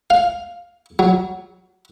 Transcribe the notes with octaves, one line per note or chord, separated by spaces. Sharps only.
F5
F#3